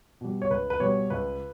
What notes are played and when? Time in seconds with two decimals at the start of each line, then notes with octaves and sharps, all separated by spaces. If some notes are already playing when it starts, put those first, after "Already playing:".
0.21 B2 G3
0.42 C#5
0.51 C#2 B4
0.70 B4
0.80 B2 G3 C#5
1.10 C#2 B4